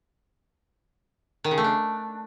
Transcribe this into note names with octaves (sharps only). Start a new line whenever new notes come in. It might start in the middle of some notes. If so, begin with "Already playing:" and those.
D#3
C#3
A3
D4